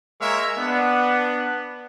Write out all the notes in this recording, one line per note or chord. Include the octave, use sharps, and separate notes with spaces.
G#3 A#3 A#4 C#5 E5
B3 D4